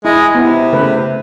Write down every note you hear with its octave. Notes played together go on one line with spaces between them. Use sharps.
G#3 E4
C3 B3 E4
C#3 A3 B4